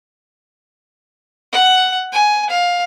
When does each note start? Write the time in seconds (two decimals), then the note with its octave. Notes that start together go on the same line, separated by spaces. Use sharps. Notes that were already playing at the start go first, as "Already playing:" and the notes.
1.52 F#5
2.12 G#5
2.50 F5